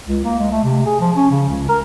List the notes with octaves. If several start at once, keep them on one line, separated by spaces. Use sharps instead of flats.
C#2
A#3
G#3
A3
C3
G#4
F3
C#4
C#3
C#2
A#4